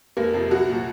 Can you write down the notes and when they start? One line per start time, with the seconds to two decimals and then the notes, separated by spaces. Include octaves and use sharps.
0.17 F1 A#3
0.34 F2 C3 F3
0.51 C2 F#3 F#4
0.69 A#2 F3